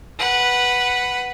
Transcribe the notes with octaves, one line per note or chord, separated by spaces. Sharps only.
B4 F#5